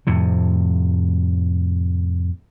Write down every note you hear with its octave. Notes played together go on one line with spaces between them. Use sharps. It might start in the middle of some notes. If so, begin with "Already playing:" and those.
F2 A2 C3